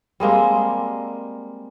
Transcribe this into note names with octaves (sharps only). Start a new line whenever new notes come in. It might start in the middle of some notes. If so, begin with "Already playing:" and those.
G3 G#3 A#3 C4